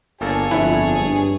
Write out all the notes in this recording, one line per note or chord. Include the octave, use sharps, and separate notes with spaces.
G1 A#3 G#4 A4 C#5 A5
G1 F2 E4 E5 F#5
G2